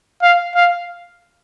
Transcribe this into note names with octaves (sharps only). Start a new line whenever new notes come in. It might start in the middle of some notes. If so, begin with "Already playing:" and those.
F5
F5